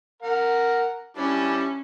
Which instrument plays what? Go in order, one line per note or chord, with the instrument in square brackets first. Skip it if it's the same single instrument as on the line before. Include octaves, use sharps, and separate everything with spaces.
[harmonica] A#4 F#5
[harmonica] G3 D4 E4 [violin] C#4